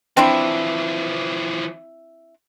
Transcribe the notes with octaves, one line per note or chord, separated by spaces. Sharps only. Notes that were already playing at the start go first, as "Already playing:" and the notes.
E3 F3 C4 D4 E4